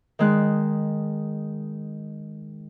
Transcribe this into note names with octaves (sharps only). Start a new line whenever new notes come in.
D#3 G#3 F#6